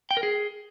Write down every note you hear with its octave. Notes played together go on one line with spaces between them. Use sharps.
G5
A#4
G#4